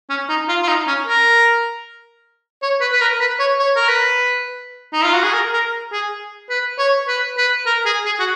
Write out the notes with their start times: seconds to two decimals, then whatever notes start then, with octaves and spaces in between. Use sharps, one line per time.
0.09 C#4
0.29 D#4
0.48 F4
0.63 F4
0.68 D#4
0.87 C#4
1.07 A#4
2.62 C#5
2.81 B4
2.93 B4
3.01 A#4
3.20 B4
3.39 C#5
3.59 C#5
3.76 A#4
3.88 B4
4.93 D#4
5.04 F4
5.14 F#4
5.23 G#4
5.34 A#4
5.53 A#4
5.92 G#4
6.50 B4
6.79 C#5
7.08 B4
7.38 B4
7.66 A#4
7.86 G#4
8.06 G#4
8.20 F#4